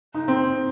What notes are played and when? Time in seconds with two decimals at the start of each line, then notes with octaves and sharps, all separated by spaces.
0.14 D#4
0.28 C4